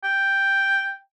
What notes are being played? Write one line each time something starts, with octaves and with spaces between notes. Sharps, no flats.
G5